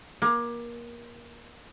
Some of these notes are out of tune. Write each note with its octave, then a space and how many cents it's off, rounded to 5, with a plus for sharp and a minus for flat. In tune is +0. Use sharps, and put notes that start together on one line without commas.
A#3 +25